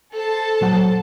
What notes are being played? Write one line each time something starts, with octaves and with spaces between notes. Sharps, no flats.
A4 C5 A5
A#2 F#3 F#5